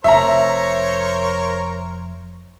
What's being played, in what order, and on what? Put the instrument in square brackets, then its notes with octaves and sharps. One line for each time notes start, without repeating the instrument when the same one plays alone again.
[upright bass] F1 F2 [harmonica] A#4 C5 C#5 [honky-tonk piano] E5 A#5